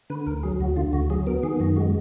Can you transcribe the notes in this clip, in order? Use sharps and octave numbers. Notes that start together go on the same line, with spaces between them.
D3 B4
D2 A#4
F#3 G#4
D2 F#4
D3 F4
D2 F#4
F#3 G#4
B3 A#4
D#3 G#4
F#2 F#4
G#3 F#4